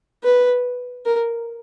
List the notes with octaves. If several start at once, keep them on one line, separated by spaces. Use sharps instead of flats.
B4
A#4